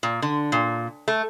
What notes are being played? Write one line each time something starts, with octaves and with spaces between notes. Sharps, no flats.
A#2
D3
A#2
A3